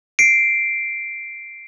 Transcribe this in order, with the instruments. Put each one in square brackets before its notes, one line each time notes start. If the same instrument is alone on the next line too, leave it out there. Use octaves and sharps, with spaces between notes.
[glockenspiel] C7 D7